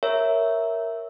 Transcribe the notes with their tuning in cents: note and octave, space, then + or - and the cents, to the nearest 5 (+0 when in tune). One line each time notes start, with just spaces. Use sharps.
A#4 +0 C#5 +0 E5 +0